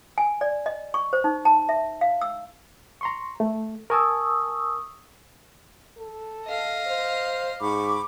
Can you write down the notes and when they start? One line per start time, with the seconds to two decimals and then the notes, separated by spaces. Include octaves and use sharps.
0.18 G#5
0.41 D5
0.66 D#5
0.94 C#6
1.13 C5
1.24 D#4
1.45 A5
1.69 E5
2.01 F5
2.22 E6
3.01 A#5 C6 C#6
3.40 A3
3.90 A#4 G#5 A5 C#6 D#6 E6
5.97 A4
6.47 D#5 F5
6.87 C5
7.61 G#2 B5 C#6 D6